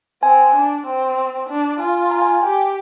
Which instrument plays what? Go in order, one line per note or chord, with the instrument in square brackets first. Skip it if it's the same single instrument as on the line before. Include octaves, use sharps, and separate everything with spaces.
[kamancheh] C4 [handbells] G#5
[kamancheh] D4
C4
D4
[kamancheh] F4 [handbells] G#5
[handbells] A#5
G#5
[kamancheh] G4 [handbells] G5